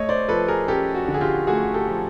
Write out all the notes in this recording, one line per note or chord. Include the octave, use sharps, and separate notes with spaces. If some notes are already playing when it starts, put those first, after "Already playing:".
Already playing: A3 C#5 D#5
C5 D5
F3 A4 B4
G#4 A#4
C#4 G4 A4
F#4
D3
G#4
F4 G4
A3 F#4 G#4
G4 A4
F3